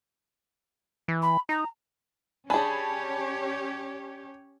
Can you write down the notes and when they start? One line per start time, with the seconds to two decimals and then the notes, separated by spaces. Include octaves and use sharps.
1.08 E3
1.22 B5
1.49 D#4 A#5
2.50 C#4 D4 G4 G#4 C#5 G#5 A5 B5